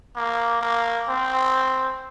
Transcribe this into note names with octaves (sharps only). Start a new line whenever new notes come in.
A#3
A#3
C4